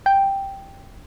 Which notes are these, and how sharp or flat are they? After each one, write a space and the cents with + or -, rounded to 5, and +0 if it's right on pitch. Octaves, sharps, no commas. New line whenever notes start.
G5 +0